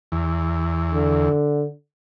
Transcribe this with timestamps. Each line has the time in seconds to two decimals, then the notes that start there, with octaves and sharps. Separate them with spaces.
0.12 E2
0.94 D3